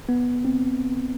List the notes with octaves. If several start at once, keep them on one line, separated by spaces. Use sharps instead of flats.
B3
C4